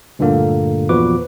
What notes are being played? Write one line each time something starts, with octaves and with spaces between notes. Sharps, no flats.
D2 G2 A#2 D3 A#3
E2 A#2 F3 F#4 B4 D6